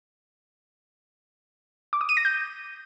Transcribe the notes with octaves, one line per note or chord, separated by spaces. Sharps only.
D6
D#6
D#7
A#6
G6